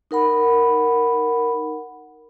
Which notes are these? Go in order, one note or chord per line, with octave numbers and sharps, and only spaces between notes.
D#4 A#4 F#5 B5